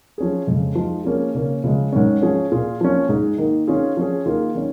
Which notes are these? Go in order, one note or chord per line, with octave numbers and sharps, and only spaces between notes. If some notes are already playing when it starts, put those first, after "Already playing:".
F3 C#4 G#4
F2 C#3 G#3
F3 G#3 D#4
F3 A#3 C#4 G#4
C#3 A#3 C#4
C#3 F3 G#3
G#2 D#3 C#4
F3 C#4 F4 G#4
A#2 A#3 F4 G#4
F3 A#3 C#4
G#2 G#3 D#4 G#4
D#3 A#3 D#4
D#3 C#4 F4 G#4
F3 C#4 G#4
D#3 A#3 F4 G#4
D#3 C#4